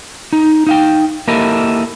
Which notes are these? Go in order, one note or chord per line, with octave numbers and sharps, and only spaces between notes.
D#4
D#4 F5 G5
A#3 E4 G4 A4 A#4 D#5